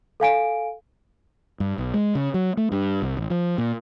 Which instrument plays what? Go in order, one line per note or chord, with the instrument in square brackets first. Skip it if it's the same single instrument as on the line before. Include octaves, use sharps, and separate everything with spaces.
[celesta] A4 F5 G#5 D7
[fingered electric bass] G2
B1
G#3
C#3
F#3
A3
G2
C2
A1
F3
A#2